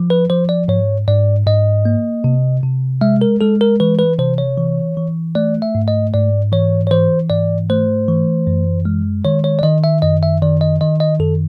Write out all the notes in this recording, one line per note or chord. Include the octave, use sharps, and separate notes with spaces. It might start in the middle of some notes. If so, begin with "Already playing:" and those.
Already playing: F3
B4
F3 C5
D5
G#2 C#5
G#2 D5
G#2 D#5
A#3
C3
C3
G#3 E5
A#4
G#3 A4
A#4
E3 B4
B4
C3 C5
C#5
E3
E3
A3 D5
E5
G#2
D#5
G#2 D5
E3 C#5
C#5
E3 C5
G#2 D5
A3 C5
E3
F#2
G#3
D#3 C#5
C#5
D5
D#3 D#5
E5
F#2 D#5
E5
D#3 D5
D#5
D#3 D#5
D#5
F#2 A4